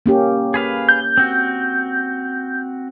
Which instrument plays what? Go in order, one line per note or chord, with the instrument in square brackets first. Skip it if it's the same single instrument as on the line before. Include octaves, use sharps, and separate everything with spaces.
[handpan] A#3 C#4 G4
[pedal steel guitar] G#4 B4 F5
[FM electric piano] G6
[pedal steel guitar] C4 F#4